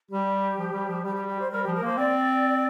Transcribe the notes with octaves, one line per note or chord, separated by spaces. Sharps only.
G3 G4
F3
G3
F3
G3 G4
G4
G4
C5
G3 A#4
F3 G4
A#4
A#3 C5
C4 D5